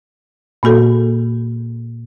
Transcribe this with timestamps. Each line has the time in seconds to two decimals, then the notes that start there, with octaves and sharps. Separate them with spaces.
0.63 A#2 A#3 F#4 A4